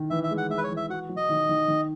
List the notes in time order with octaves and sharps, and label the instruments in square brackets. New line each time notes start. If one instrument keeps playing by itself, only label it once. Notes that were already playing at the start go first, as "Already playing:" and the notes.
Already playing: [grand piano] D#3
[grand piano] E3 [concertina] E5
[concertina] E5
[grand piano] G#3
[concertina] F#5
[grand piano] G#3 [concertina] E5
[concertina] B4
C#5
[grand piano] E3
[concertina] E5
[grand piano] F#4 [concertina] F#5
[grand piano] F#3
[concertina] D#5
[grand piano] D#3
D#3
D#3